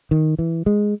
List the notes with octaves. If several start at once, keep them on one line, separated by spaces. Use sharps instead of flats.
D#3
E3
G#3